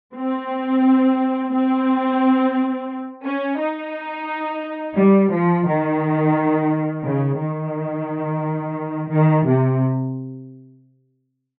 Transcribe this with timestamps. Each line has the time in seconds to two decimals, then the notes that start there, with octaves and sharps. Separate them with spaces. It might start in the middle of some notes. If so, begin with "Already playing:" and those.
0.15 C4
1.53 C4
3.25 C#4
3.59 D#4
4.97 G3
5.31 F3
5.66 D#3
7.05 C#3
7.38 D#3
9.10 D#3
9.45 C3